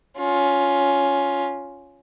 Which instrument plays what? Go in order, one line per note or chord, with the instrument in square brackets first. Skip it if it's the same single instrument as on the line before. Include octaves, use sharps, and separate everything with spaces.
[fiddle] C#4 F4